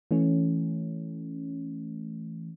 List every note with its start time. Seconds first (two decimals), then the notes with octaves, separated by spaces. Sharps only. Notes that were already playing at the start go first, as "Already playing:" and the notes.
0.11 E3 A3 C#4